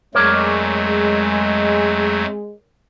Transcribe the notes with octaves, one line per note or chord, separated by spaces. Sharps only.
F2 F#3 G#3 A3 A#4 C#5 D5